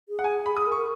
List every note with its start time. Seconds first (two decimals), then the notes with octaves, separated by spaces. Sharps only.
0.09 G#4
0.19 F#5
0.24 G#5
0.46 B5
0.56 G#4 D#6
0.67 A#4
0.72 C#6
0.77 A#4